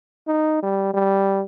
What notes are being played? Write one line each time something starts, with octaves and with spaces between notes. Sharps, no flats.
D#4
G3
G3